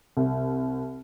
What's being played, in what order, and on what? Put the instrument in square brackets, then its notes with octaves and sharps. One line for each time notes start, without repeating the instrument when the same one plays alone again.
[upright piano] C2